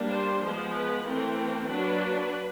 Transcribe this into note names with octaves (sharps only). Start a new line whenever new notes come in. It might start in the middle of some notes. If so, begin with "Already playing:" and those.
Already playing: G3 A#3 D4
C5
F3 G#3 B3 C5
B4
E3 A3 C4 A#4
F#3 A#3 D4 B4